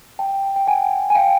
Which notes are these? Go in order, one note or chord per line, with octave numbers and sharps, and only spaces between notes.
G5 A5
G5
F#5 G#5
G#5
F5 G5